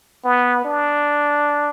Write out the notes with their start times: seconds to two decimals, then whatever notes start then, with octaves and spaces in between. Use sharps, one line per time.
0.25 B3
0.64 D4